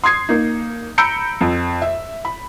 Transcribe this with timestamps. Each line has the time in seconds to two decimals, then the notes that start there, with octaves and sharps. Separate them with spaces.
0.04 C6 D#6 G#6 C7
0.29 A#3 D#4
0.98 A#5 B5 E6 G6 C#7 D7
1.41 F2
1.82 E5
2.25 B5